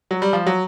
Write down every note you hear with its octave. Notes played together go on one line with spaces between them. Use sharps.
F#3
G3
F3
F#3